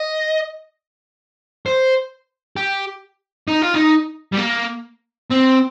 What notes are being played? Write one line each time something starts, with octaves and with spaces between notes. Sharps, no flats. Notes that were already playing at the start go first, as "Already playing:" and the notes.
Already playing: D#5
C5
G4
D#4
F4
D#4
G3
A#3
C4